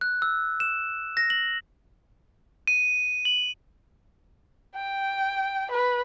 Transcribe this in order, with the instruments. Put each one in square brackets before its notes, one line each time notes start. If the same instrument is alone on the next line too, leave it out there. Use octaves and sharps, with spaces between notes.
[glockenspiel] F#6
E6
E7
A#6
F#7
[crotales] D#7
F#7
[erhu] G5
B4